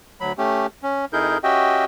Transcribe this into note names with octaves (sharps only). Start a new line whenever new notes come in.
D2 F#3 B5
A3 C#4 G4
C#4
F2 D#4 E4 G#4 A#4 G6
C#4 F#4 G4 D#5 E5 G5